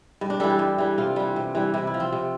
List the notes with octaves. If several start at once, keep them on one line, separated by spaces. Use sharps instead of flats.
G2
D4
E3 G3 A4
G4
G2
E3 G3
C3 F4
E3 G3
C3
E3 G3
C3 E4
E4
F3
C4
C3